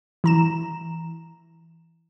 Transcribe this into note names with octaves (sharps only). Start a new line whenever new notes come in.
E3 A#5 E7